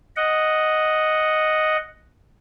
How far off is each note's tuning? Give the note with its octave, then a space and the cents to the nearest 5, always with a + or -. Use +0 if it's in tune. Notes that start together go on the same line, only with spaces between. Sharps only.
D#5 +0 F#5 +0